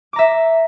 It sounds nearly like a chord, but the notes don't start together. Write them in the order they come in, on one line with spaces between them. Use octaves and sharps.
D6 A#5 E5